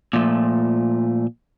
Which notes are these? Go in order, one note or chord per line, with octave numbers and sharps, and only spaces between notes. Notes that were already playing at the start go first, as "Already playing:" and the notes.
A#2 F3 A3